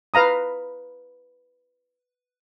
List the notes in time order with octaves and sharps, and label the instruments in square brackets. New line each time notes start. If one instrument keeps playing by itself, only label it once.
[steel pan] B4 F5 A#5 D#6